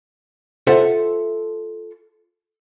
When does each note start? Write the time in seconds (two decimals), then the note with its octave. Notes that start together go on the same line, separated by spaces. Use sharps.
0.67 F4 A4 C5 E5 F#5